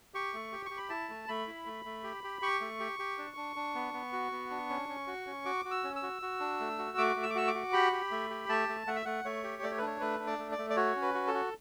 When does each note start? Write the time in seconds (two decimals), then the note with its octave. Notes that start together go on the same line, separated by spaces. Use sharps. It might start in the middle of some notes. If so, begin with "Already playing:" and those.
0.14 G4 C#6
0.34 A3
0.52 G4
0.66 G4 C#6
0.78 B5
0.90 E4 A5
1.09 A3
1.28 A3 B5
1.47 E4
1.66 A3
1.85 A3
2.04 G4
2.24 G4
2.42 G4 C#6
2.61 A3
2.80 G4
2.99 G4
3.18 D4
3.37 D4
3.56 D4
3.75 B3
3.94 B3
4.13 F#4
4.32 B3
4.50 D4
4.70 C#4
4.89 C#4
5.07 F#4
5.27 C#4
5.45 F#4 D6
5.65 F#4
5.71 E6
5.84 C#4
5.96 E6
6.03 F#4
6.22 F#4
6.40 D4
6.60 A3
6.79 F#4
6.98 A3 D6
7.16 A3
7.23 E6
7.30 D6
7.35 F#4 E6
7.47 D6
7.55 F#4
7.73 G4 B5
7.93 G4
8.11 A3
8.30 G4
8.49 A3 A5
8.69 A3
8.87 A3 F#5
8.96 E5
9.05 A3 F#5
9.24 A3 C#5
9.44 G4
9.63 A3 D5
9.71 C#5
9.78 B4
9.82 D4
9.87 C#5
10.00 A3 B4
10.20 D4
10.27 D5
10.39 A3
10.52 D5
10.58 A3
10.70 D5
10.76 F#4 C#5
10.96 C#4
11.02 B4
11.14 F#4
11.27 A4
11.34 F#4